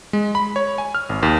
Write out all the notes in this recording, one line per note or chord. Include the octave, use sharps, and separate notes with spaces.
G#3
B5
C#5
G#5
F6
G#1
D#2